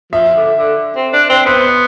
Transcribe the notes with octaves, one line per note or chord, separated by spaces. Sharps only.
F3 E5
D3
D3
C4
D4
C4
B3 C5